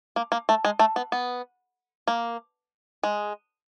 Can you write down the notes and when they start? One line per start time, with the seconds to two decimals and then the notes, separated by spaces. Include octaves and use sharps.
0.16 A#3
0.32 A#3
0.49 A3
0.65 G#3
0.79 A3
0.96 B3
1.12 B3
2.07 A#3
3.03 G#3